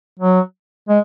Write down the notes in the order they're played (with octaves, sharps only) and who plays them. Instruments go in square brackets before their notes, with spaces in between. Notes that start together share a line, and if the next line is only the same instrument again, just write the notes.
[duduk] F#3
G#3